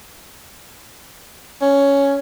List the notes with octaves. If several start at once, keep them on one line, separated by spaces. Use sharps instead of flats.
C#4